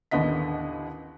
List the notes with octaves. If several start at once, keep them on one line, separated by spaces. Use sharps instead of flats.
A1 D#2 D3 B3 D#5 B6